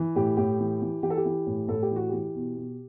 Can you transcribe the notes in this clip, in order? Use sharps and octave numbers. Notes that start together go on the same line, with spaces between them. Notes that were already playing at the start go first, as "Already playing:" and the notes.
Already playing: E3
A2 G4
A2 G4
E3
E3
E3 G4
A4
G4
E3
A2
A2 A4
G4
E3 F#4
E3 G4
B2
B2